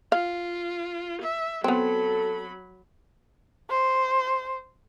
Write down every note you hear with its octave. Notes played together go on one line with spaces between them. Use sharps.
F4 F5
E5
F#3 B3 C4 A4 B5
C5